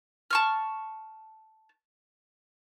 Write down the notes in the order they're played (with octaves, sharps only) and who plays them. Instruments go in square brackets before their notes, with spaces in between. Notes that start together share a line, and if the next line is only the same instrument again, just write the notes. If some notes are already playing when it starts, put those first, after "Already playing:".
[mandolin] A5 C#6 F6